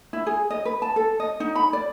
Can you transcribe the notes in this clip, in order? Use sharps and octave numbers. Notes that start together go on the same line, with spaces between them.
E4
G#4
D#5
B4
A5
A4
D#5
D#4
B5
D5